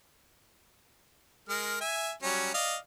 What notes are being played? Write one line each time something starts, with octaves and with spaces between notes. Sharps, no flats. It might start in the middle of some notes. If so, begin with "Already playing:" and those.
G#3 A#4 F6
E5 G#5
F#3 G3 C#4
D5 D#5 F5